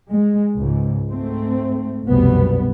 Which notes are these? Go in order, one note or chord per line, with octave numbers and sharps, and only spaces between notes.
G#3
C#2 G#2
G#2 A3 C4
F1 C2 F#2 B2 G3 B3